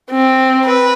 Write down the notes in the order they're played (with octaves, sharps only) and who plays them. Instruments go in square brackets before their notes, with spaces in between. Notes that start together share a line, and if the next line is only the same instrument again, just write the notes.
[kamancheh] C4
[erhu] B4